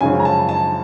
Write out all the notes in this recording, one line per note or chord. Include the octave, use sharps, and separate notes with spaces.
F#2 C#3 F3 G#3 C#4 G#5
A#5
A5
A5